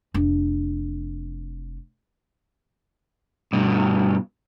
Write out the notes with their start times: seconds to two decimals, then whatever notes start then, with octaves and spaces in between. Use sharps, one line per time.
0.14 F1 D4
3.53 G2 B2